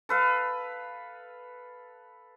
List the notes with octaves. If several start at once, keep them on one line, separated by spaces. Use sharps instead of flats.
A4 B4 F5